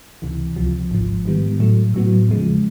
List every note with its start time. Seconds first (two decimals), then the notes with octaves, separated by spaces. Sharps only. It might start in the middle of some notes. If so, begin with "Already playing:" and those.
0.22 C#2 C3 E3
0.56 C#2 C3 F3
0.91 G#1 G#2 F3
1.25 G#2 D#3 G3 B3
1.59 A2 F#3 A3
1.94 A2 F#3 B3
2.28 E2 C#3 F3 G#3